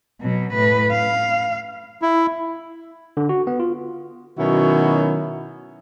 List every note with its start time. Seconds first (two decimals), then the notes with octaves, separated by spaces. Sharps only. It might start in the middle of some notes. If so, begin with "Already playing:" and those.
0.22 B2 F#3
0.53 A2 B4
0.92 F5
2.02 E4
3.17 D3
3.29 F#4
3.47 B3
3.60 F4
4.37 B2 D#3 F#3 C#4 E4 F#4